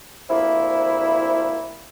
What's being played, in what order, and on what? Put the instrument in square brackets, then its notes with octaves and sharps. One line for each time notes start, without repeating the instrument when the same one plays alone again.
[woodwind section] D2 C3 F3 A#3 E4